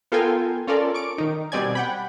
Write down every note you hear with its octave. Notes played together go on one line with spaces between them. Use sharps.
B3 F4 A4 A#4 G5 G#5
C#4 F4 A4 A#4 D5
C#6 D6 D7
D#3 D#4
B2 G3 C4 D5 G#5 G#6
F#5 G5 B5